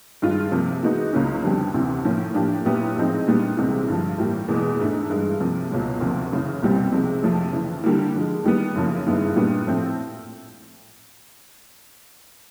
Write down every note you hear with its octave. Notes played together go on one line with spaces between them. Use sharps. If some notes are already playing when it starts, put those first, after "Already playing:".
G2 D#3 G#3 C#4 F4
C3 F3 A#3
E3 G#3 B3 D#4 F#4
C#2 C#3 F#3 A#3 C#4
F2 D3 G3 B3 D4
D2 C3 E3
A2 F3 A#3 C#4
A2 F3 A#3 D4 G4
A#2 F#3 B3 E4 G4
A2 F3 G#3 C4 D#4
A#2 G3 B3 D4
C2 C3 E3 G#3
G2 D3 F3
A2 E3 G3 A#3
E2 B2 G#3
G#2 E3 A3 D4
G2 E3 G#3
C3 F3 A#3
C#2 B2 F#3 A#3
D2 C3 F3 A#3
F#2 C#3 E3
C2 B2 G3 C4
C3 F3 G#3
F2 C3 F3 A3
F2 C#3 E3
D3 G3 A#3
D3 F3 G#3
D#3 G3 B3
F#2 C#3 F3 A#3
G2 D#3 G#3 B3 E4
A#2 G3 B3 D4
A2 F3 A3 C4